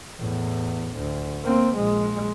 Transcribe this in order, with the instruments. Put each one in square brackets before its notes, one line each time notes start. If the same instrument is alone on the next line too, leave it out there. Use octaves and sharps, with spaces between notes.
[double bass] E2 A2
D2
A#3 C4
A#1 G#3